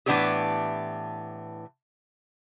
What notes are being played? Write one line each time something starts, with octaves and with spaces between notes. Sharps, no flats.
A2 E3 B3 D4 G4 G#4